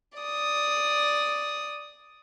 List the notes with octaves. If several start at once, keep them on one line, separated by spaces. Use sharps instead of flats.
D5 D#6